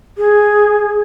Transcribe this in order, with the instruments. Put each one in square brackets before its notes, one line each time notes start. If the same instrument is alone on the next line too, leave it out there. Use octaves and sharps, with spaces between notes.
[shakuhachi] G#4